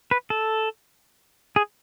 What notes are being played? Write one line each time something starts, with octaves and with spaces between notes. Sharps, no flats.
B4
A4
G#4